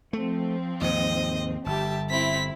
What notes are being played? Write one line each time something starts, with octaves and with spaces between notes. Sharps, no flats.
F3 A3 C4
D#2 G#2 D#5
G1 G4 E5 A5
C4 E4 B6